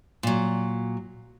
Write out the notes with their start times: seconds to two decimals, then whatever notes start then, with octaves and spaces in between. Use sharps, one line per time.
0.23 A#2 F#3